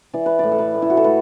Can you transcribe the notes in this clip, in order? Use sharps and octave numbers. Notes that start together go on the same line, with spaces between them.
E3 D5
B4
A2 D5
A4
B4
A2
E4
F#4
A4
A3 B4